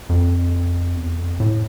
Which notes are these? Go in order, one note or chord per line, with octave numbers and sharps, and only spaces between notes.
F2
E2
F2
A2